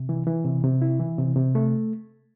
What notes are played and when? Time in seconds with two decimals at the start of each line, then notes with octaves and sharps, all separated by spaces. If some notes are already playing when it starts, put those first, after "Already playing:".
Already playing: C3
0.09 E3
0.27 E3
0.45 C3
0.64 C3
0.82 E4
1.00 E3
1.18 C3
1.36 C3
1.55 A3